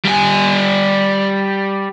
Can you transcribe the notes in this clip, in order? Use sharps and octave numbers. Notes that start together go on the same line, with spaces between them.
G3 G#5